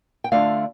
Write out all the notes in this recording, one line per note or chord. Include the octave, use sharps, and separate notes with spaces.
G5
D3 A3 D4 F4 F5